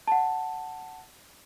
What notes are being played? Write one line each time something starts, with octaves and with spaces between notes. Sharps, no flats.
F#5 A5